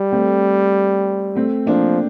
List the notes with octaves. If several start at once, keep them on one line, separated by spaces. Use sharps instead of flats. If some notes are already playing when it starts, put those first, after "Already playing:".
Already playing: G3
A3 C4
A3 C4
F3 A#3 D4